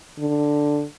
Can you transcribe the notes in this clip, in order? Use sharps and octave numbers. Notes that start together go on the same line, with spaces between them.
D3